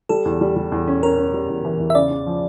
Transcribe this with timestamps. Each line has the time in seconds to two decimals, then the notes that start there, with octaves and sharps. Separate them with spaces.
0.09 G3 A4
0.25 E2
0.41 G3
0.56 G3
0.72 E2
0.88 C#4
1.03 C#4 A#4
1.18 C#4
1.34 G3
1.49 E2
1.65 E3
1.80 E2
1.90 E5
1.95 C#3 D5
2.11 C#3
2.26 F3